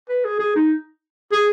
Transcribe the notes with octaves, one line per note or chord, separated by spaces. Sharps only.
B4
G#4
G#4
D#4
G#4